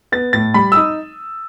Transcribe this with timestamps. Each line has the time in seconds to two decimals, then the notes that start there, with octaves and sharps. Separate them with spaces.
0.12 B3 A6
0.33 A2 A6
0.54 G3 B5
0.72 E6
0.75 D#4 D#6